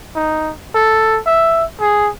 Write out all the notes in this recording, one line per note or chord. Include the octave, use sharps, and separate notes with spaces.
D#4
A4
E5
G#4